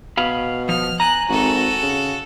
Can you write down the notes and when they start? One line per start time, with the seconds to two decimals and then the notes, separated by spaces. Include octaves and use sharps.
0.17 B2 F5 B5
0.69 F3 F6
1.00 G#5 A#5 F#6
1.29 G#1 F#4 A4
1.82 C#3